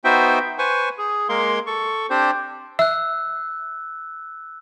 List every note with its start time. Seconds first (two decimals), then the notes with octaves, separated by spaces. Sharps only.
0.05 B3 D#4 F#4 C5 E5 G5
0.58 B4 C5 G#5 C#6
0.98 G#4
1.29 G#3 A#3 A#4 F5 C6
1.67 A4 C#6
2.10 C4 D4 G4 C5
2.79 E5 E6 F#6